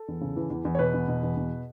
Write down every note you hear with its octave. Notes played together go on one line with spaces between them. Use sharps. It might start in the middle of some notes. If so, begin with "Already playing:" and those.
Already playing: A4
E2
C#3
E3
E2
E2
C#5
B2 B4
E2
B2
E2
B2